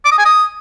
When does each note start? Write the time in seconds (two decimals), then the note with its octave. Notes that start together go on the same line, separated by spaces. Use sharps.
0.05 D6
0.12 D#6
0.18 G#5
0.25 D#6